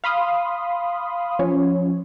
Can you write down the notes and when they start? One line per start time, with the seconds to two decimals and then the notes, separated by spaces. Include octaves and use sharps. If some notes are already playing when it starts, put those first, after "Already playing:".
0.04 F5 B5 C6 D#6
1.39 F3 C#4 C#5